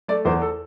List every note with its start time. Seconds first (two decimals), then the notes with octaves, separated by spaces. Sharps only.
0.08 A3 D5
0.25 E2 C5
0.42 A4